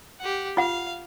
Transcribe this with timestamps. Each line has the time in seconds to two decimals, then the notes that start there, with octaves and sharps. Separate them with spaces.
0.20 G4 F#5
0.57 F4 F5 F#5